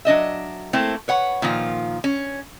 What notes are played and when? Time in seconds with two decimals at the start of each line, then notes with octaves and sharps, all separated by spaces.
0.05 F#3 D4 D#5 E5
0.73 A3 A#3 C4 E4 A4
1.08 B4 C#5 F#5
1.42 A#2 D#3 F3 F4
2.04 C#4